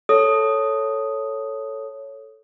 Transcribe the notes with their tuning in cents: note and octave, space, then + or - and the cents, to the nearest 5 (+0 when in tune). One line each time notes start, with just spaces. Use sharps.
A4 +0 C#5 +0 D#6 +0